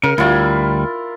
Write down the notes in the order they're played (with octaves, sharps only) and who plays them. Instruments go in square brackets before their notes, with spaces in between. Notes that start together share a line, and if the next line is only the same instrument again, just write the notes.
[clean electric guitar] C#3 [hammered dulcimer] A#4
[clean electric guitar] D2 G3 [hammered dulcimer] E4 F4